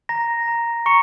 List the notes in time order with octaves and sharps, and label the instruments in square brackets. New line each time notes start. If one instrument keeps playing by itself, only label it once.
[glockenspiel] A#5 A#6
A#5
A#5 C#6 C#7